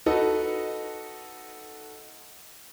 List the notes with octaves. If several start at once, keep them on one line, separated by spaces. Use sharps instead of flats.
D#4 F#4 A4 B4 D#5